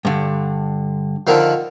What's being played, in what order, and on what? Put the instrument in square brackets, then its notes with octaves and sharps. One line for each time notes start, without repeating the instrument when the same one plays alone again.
[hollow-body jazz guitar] G2 D3
[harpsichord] D3 D#3 F3